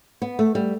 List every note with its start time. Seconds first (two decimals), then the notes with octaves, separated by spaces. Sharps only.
0.22 B3
0.39 A3
0.55 G3